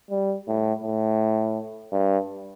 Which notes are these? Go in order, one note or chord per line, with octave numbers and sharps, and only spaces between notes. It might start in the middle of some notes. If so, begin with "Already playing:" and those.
G3
A2
A2
G2